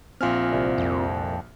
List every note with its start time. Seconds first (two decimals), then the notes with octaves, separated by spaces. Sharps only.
0.21 A#1 C4 F4 G#5 F6
0.53 C2
0.78 F2